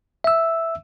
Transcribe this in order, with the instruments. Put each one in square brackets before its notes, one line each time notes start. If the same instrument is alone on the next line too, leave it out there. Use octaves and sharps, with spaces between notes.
[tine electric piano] E5 E6